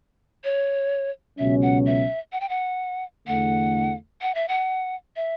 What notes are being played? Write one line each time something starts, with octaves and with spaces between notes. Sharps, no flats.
C#5
C#2 B2 F#3 C#4 E5
F#5
E5
F#5
G5
F#5
E2 D3 A3 F#5
F#5
E5
F#5
E5